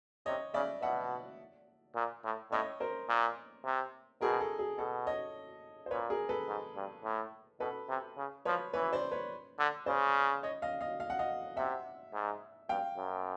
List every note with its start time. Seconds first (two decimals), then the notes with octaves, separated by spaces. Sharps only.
0.26 C3 C#5 D#5
0.54 C#3 D5 E5
0.82 B2 E5 F#5
1.96 A#2
2.24 A2
2.52 A2 C#5 D#5
2.80 A#4 C5
3.09 A#2
3.65 C3
4.21 B2 G#4 A#4
4.40 A4
4.59 G#4
4.78 B2 A4
5.07 C#5 D#5
5.86 C5
5.91 A#2 B4 C#5
6.10 G#4 A#4
6.29 A4 B4
6.48 G#2
6.76 G2
7.04 A2
7.60 B2 A4 B4
7.89 C3
8.17 C#3
8.45 F3 B4 C#5
8.74 E3 B4 C#5
8.93 C5 D5
9.12 B4 C#5
9.59 D3
9.86 C#3 C5 D5
10.43 C#5 D#5
10.62 D#5 F5
10.81 D#5 F5
11.00 F5
11.10 F#5
11.19 D#5 F5
11.57 C3 E5 F#5
12.14 G#2
12.69 G2 F5 G5
12.97 F#2